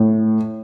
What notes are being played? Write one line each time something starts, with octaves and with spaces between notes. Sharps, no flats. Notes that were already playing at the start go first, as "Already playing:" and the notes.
Already playing: A2